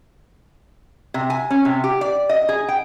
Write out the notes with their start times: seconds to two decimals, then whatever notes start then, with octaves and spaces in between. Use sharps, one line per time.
1.14 C3
1.30 G#5
1.50 C#4
1.65 C3
1.84 G4
2.01 D5
2.29 D#5
2.49 G#4
2.68 G5